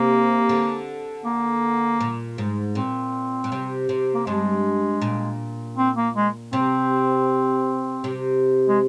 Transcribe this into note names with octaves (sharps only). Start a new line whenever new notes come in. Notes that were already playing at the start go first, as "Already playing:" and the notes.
Already playing: C3 A#3
D3
A#3
A#2
G#2
A#2 C4
A#2
C3
C3
A#3
G2 G#3
A#2
C4
A#3
G#3
C3 C4
C3
G#3